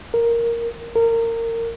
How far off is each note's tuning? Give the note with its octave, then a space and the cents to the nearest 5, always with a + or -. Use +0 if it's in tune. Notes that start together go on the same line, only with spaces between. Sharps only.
A#4 +0
A#4 -25